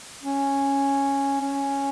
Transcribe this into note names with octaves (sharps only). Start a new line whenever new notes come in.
C#4
C#4